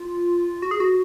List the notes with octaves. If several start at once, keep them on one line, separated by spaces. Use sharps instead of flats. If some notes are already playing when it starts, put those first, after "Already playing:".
Already playing: F4
F#4
G#4
F#4